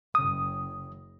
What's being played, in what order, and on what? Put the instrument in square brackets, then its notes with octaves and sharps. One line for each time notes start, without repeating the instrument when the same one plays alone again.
[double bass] F#1 C#3 [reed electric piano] D#6